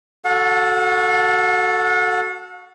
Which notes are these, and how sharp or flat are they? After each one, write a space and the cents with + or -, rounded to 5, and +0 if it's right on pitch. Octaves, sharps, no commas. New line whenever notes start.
F#4 +0 A4 +0 F#5 -45